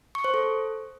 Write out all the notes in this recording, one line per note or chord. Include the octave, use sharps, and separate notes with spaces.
C#6
C5
A4